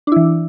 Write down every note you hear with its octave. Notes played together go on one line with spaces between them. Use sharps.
E3 D4 E4